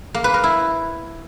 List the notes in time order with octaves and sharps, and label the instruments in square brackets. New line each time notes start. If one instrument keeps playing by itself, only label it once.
[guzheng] A#3
B4
A#4
E4